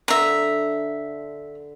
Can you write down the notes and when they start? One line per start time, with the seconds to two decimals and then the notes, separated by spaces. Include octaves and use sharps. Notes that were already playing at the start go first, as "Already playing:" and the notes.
0.08 D3 E5 A#5